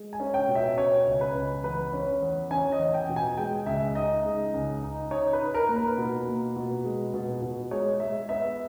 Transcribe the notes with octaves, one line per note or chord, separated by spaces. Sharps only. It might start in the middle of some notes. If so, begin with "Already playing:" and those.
Already playing: G#3
G#5
C#4
G5
B2
E5
C#4 C#5
C#2
B4
C#2
E2 B4
C#4
E2
C#4 G#5
D#5
E2
G5
B2
G#5
G#3 G5
C#2 E5
D#4 D#5
G#3
C#2
D#4
D#4 C#5
B4
D#4
A#4
A#3
B4
B2
A#3
B2
G#3
B2
B2
G#3 C#5
G#3 E5
B3 E5